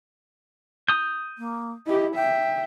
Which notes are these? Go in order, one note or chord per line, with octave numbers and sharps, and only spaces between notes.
D#6 G6
A#3
E4 G4 D#5
E5 G5